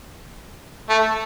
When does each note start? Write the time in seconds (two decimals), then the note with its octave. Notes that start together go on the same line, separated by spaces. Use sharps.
0.89 A3